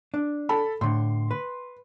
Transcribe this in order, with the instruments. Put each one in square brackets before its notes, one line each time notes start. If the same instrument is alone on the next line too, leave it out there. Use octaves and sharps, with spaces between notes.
[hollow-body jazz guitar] D4
[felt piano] A4 A5 B5
[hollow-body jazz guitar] A2 D3 [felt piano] C6
[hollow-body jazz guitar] B4